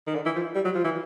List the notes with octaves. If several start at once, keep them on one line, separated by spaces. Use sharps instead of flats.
D#3
D3
E3
F3
G3
F#3
F3
E3